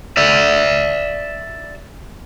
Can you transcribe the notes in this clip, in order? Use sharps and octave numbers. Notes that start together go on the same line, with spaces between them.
D5 E5